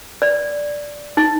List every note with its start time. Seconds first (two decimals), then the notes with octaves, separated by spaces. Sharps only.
0.22 D5
1.17 D#4